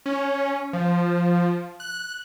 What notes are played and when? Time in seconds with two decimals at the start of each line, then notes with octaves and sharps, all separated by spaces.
0.06 C#4
0.73 F3
1.80 F#6